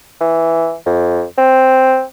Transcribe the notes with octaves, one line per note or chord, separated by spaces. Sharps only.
E3
F2
C4